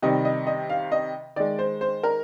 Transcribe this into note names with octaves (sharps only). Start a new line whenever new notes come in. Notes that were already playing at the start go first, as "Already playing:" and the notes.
C3 D#3 G3 D#5
D#5
D#5
F5
D#5
D#3 G#3 D5
C5
C5
A#4